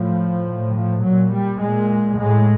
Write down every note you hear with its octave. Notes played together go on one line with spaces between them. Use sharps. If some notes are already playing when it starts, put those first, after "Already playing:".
Already playing: A2 F3
A2
F3
A#2 F#3
G3
A#2 G#3
A2 G#3